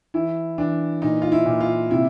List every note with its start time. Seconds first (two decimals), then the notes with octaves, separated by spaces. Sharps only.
0.14 E3 E4
0.58 E3 D4
1.02 A#2 D#4
1.22 F4
1.32 E4
1.46 A#2
1.60 F4
1.90 C3 E4